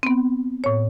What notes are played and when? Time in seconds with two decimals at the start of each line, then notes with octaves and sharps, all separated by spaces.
0.03 B3 C4
0.64 A2 C#5